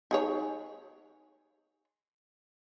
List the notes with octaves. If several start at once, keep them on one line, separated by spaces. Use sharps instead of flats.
D#4 G#4 C#5